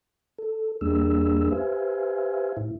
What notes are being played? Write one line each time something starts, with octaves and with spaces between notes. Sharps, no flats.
A4
E2 G3 A#3 D4 G#4 E6
G4 B4 C5 E5 F5 G#5
A2 E4